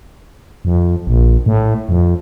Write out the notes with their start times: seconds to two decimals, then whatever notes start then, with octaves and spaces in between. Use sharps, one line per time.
0.65 F2
1.07 A#1
1.46 A2
1.89 F2